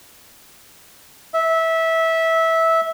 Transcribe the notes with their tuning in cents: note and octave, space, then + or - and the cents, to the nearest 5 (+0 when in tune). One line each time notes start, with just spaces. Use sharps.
E5 -15